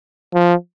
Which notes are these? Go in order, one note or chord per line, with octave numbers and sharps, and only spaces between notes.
F3